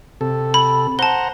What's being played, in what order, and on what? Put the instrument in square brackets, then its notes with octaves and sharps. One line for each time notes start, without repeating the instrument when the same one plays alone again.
[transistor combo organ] C3 A4
[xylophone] B5
[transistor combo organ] C5 F#5 A#5 [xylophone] A5 G7